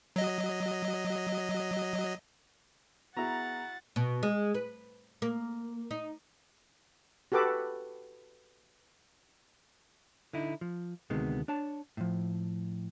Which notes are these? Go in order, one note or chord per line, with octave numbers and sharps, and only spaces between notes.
F#3 D#5
B3 E4 F#4 G#4 F#5 A#5 A6
B2
G#3
B4
A#3
D#4
F#4 G4 A4 B4 D6
D3 D#4 E4
F3
D2 C3 D#3 G#3 B3
D4 C#5 A5
A2 F3